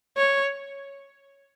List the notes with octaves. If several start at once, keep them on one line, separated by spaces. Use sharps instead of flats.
C#5